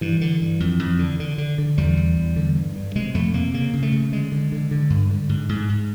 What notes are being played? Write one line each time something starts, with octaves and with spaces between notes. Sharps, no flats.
G2 E3
D3
G2
F2
F2
D3
D3
D3
D3
E2 G3
E2
E2
D3
G2
G2
C3 G#3
F2 A3
C3 A#3
C#3 A#3
C#3
A3
C#3
D3 G#3
D3
D3
D3
G2
D3
G#2
G#2
G#2